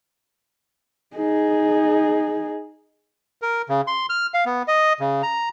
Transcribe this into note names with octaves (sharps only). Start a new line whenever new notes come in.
D#4 G#4
A#4
C#3
C6
F6
F5
B3
D#5
C#3
A#5